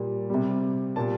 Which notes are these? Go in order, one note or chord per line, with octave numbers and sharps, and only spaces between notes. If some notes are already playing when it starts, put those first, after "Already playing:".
Already playing: A#2 G3
C3 G3
A#2 G3 A5